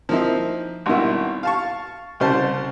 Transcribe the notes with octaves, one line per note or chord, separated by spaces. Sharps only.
F3 A#3 C4 D#4 E4
G#1 G2 B2 D#3 E4
F5 A5 C#6
C2 C#3 C5 A5